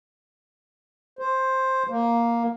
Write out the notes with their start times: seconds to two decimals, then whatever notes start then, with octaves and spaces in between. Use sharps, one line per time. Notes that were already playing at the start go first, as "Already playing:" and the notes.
1.19 C5
1.90 A#3